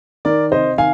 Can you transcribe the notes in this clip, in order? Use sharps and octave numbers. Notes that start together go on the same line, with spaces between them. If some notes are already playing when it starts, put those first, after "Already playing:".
D#3 A#4 D5
C3 C5 D#5
D#3 F5 G#5